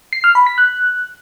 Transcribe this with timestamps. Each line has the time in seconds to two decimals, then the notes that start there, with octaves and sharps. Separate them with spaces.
0.13 C7
0.24 F6
0.35 B5
0.46 B6
0.58 F#6